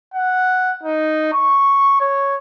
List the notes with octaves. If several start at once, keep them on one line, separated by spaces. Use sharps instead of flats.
F#5
D#4
C#6
C#5